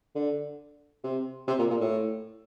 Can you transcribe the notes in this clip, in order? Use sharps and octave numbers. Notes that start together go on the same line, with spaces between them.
D3
C3
C3
A#2
A#2
A2